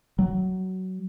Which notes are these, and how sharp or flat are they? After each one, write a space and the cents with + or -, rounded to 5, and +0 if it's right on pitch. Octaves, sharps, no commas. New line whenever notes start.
F#3 +15